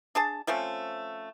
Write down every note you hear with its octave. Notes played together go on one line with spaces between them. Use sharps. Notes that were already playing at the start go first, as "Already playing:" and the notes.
D4 G#4 A5
F3 A3 C4 C#4